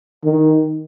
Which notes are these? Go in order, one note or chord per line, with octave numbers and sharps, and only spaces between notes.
D#3